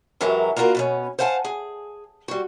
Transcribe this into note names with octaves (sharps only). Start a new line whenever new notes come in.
F#2 E3 F#3 G#3 G4 A#4
A#3 D4 F4 F#4 A#4 B4
B2 B3 C#4
C5 F5 F#5 G#5 A5
G#4
G3 F#4